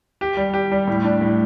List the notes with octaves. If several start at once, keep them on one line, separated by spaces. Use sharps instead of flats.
G4
G3
G4
G3
A2
D4
A2